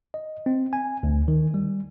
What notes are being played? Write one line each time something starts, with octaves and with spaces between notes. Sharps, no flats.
D#5
C4
G#5
D2
D#3
G3